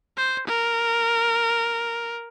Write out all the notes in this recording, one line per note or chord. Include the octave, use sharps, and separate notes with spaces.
C5
A#4